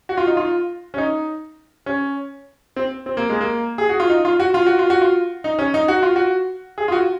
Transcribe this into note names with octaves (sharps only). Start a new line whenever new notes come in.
F#4
F4
D#4
F4
C#4
D#4
C#4
C4
C4
A#3
G#3
A#3
G#4
F#4
F4
D#4
F4
F#4
F4
F#4
F4
F#4
F4
D#4
C#4
D#4
F#4
F4
F#4
G#4
F4
F#4